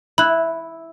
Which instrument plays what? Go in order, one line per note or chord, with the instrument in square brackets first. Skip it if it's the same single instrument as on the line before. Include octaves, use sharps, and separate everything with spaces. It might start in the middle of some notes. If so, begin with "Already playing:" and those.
[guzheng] E4 [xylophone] B5 F#6